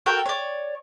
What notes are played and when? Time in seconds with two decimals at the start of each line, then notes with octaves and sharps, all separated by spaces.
0.06 F#4 A4 A#4 G5
0.26 C#5 D5